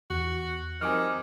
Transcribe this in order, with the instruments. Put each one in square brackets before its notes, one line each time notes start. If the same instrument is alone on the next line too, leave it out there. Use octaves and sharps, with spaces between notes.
[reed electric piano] E2 [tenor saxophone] F#4
[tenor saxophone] D#3 [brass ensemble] F3 G3 C4 [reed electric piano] G#5 D6 F6